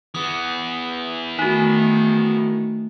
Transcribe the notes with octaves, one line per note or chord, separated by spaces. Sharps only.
E3 B3 D#6
D#3 A3 D#4 F#4